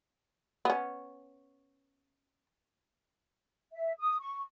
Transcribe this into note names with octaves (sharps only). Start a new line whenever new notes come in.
B3 C#4
E5
D#6
C#6